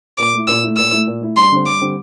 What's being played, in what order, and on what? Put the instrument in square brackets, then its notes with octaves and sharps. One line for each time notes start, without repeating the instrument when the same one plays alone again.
[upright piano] A#2 [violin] D6
[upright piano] A3 E4
[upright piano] A#2 [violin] E6
[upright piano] A3 E4
[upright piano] A#2 [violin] E6
[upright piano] A3 E4
A#2
A3 E4
[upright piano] G2 [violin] C6
[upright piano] D3 G3 C4
[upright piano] G2 [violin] D6
[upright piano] D3 G3 C4